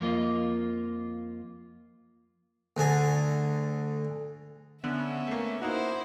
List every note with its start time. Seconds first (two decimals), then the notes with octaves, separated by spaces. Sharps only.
0.01 F2 A#3 F4 D#5
2.77 D2 D3 G#4
4.84 D3 B3 C#4 E5
5.27 A3 A#3
5.61 A#3 D#4 E4 F#4 C5